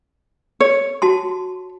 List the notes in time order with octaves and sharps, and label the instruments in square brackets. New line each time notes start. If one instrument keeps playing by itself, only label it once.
[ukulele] C#5
[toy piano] F#4 A5 C6